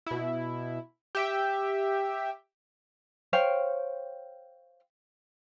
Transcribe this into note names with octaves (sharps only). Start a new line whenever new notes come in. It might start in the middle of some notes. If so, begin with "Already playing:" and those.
B2 E4
G4 E5 G5
C5 C#5 F5 G5